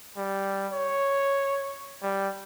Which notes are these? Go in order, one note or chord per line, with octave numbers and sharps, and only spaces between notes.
G3
C#5
G3